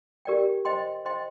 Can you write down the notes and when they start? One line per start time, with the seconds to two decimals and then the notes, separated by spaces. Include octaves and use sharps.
0.25 G4 A#4 D5 G5
0.65 C5 D#5 G5 C6
1.05 C5 D#5 G5 C6